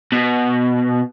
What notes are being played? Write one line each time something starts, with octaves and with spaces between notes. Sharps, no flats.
B2